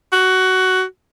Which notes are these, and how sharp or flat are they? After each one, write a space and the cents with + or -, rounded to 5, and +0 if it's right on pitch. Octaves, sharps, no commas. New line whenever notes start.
F#4 +15